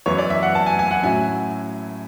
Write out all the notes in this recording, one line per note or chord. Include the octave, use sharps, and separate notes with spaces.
F#2 E3 B3 C#5
D5
E5
F#5
A5
G#5
G#5
F#5
A2 F#3 C#4 E4 G#5